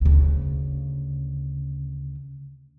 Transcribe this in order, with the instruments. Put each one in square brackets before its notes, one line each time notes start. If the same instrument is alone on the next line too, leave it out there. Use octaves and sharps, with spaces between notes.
[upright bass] D2 C#3